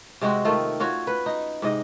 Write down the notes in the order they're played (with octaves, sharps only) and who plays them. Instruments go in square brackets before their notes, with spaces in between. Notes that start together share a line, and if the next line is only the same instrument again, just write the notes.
[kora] C3 G#3 C4 F#4
D#3 A3 F4
C#4 F4 F#4 C#5
B4
D#4
G#2 C3 D#5